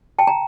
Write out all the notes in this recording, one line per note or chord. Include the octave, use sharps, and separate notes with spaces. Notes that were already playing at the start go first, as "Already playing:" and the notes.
G5 A5
A#5